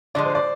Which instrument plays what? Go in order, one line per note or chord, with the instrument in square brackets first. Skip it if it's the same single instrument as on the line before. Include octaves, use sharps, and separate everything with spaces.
[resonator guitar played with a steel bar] D3 F3 G#3 [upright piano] D5
[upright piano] C5
D5